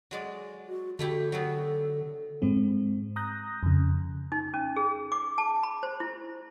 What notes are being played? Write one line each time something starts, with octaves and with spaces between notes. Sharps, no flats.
F#3 G#3 D5
F#4
D3 A3 E4 F#4 G4
F#3 A3 B3 A4
G#2 G#3 C4
A#5 D#6 F#6 G6 A#6
F2 C#3
D#4
C#4
G#4
D6
A5
B5
C5
E4